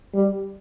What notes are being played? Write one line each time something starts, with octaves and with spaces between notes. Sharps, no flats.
G3